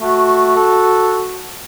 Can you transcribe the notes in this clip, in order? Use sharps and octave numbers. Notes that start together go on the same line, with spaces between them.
A3 F#4
A4